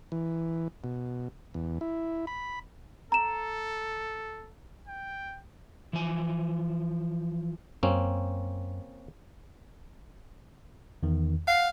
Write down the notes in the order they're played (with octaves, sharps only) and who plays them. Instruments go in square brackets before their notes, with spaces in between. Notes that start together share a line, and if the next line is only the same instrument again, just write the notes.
[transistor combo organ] E3
B2
E2
E4
B5
[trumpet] A4 [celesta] A#5 E7
[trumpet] G5
[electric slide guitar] E3 F3 G#5
[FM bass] F#2 [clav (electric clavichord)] A#3 C4 C#4
[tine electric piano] E2 D#3
[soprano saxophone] F5 [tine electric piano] F#5 C7